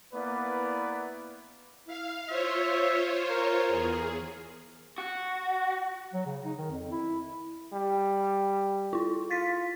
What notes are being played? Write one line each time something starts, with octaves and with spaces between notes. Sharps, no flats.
A#3 B3 E4 B4 D5
E4 F5
F4 C5 C#5 E5
A#4
E2 G#4
F#4
F#3
C#3
D#4
D#3
F2
E4
G3
E4 F4
F4 A6 B6